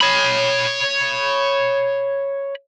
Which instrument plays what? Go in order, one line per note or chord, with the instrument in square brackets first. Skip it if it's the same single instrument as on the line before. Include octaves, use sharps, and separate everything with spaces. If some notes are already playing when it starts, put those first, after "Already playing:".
[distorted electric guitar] C#5 B5